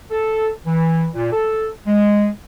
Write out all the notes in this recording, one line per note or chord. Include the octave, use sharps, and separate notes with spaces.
A4
E3
A#2
A4
G#3